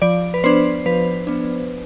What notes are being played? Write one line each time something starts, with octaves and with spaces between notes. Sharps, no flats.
F3 D5
B4
B3 D4 C5
F3 B4
B3 D4